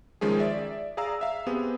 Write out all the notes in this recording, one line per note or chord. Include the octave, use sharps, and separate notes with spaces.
D#3 F3 G#3 C#4 G#4
D5 E5
G#4 D5 F5 A#5 E6
E5 F5
B3 C4 G4 G#4